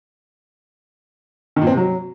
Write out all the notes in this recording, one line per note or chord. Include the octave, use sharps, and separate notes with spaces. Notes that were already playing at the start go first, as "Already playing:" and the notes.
D#3
A#2
C4
C3
F#3